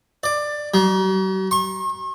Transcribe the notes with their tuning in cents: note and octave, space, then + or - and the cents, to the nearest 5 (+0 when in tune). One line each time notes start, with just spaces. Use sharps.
D5 +15
F#3 +45
C#6 -45